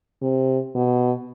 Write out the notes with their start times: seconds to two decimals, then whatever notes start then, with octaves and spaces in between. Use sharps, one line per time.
0.22 C3
0.75 B2